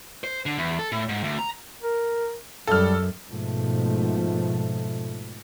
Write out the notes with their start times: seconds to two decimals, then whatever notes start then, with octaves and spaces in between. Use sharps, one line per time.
0.24 C5
0.46 D3
0.58 E2
0.79 A4
0.92 A2
1.09 G#2
1.24 D2
1.39 A#5
1.83 A#4
2.67 F#2 G3 A4 F6
3.27 G#2 B2 F3 A3